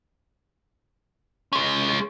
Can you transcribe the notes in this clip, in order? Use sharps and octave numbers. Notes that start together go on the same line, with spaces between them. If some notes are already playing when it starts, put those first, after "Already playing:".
G#3 C#4